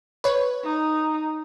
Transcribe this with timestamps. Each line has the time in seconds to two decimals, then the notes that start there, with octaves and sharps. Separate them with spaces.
0.24 B4 C#5
0.64 D#4